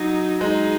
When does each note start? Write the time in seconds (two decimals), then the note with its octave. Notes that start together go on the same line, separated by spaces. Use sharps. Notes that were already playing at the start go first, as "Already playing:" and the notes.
Already playing: F#3 D#4
0.40 G#3 D#4